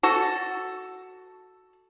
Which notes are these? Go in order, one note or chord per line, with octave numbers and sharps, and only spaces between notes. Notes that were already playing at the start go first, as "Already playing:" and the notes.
F#4 A4